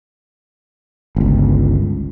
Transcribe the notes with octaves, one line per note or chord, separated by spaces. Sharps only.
G1 C#2